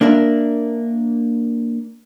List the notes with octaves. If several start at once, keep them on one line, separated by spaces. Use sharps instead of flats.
A#3 D4 A#4 E5